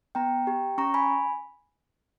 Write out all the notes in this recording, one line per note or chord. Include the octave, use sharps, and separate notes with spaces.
B3 G5 A#5
G4
C#4 A#5 C#6
G#5 B5